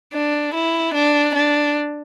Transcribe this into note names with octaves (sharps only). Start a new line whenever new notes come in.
D4
E4
D4
D4